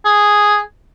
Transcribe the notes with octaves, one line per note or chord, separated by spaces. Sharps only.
G#4